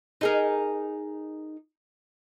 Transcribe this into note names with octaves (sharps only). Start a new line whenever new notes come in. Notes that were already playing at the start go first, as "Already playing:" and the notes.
D#4 G#4 A#4